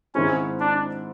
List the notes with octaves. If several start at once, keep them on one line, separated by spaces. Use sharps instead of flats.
G#2 D#3 G#3 C4 C#4 E4
D4